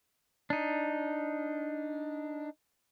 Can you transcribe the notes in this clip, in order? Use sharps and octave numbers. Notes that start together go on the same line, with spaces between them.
D4 D#4